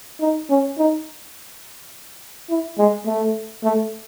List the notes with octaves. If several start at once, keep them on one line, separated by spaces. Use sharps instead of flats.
D#4
C#4
D#4
E4
G#3
A3
A3